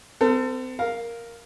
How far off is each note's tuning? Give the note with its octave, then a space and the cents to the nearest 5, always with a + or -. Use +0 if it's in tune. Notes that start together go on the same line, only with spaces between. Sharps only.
C4 -35 A4 +30
A#4 +0 F5 +0